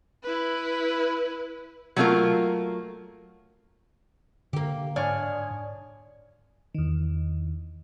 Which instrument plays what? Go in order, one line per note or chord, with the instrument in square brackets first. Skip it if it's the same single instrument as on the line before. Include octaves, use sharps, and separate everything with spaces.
[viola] E4 B4
[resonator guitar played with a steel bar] F#3 A3 A#3 E4 F4 A#4
[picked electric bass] D3 [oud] A#3 G4
[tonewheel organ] G#2 [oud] D4 [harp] C#5 G#5 F6
[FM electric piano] E2 D#3